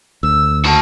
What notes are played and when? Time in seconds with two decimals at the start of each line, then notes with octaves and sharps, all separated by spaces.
0.23 D2 E6
0.66 F#4 A5